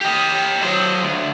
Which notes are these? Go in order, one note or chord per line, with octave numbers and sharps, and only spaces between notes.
G4 D#5
F#3 C5
D2